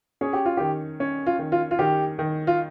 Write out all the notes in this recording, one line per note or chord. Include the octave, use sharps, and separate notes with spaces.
C#4 G#4
G4
F4
D#3 G4
C#4
F4
D#3
F4
F4
D#3 G4
D#3
F4